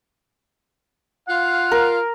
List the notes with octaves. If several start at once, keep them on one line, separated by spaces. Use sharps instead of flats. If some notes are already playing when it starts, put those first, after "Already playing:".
F4 F5 F#5
A#4